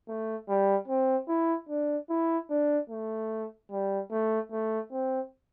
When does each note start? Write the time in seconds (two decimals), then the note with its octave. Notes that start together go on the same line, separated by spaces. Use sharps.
0.08 A3
0.49 G3
0.88 C4
1.28 E4
1.69 D4
2.10 E4
2.50 D4
2.90 A3
3.71 G3
4.12 A3
4.52 A3
4.92 C4